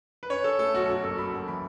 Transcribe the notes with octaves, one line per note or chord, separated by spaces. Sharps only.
B4
C#4 C#5
C#4 A4
A3 A4
B1 F#4
F#2 F#4
F#1 A4
F#1 B5
F#2
E3 B5